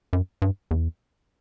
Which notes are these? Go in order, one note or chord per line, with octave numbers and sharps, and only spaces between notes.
F#2
G2
E2